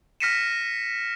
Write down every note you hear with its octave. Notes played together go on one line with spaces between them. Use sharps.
F6 A#6 B6 C#7 D#7 E7